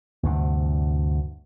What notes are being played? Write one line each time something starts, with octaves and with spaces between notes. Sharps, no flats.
D2 G2 C3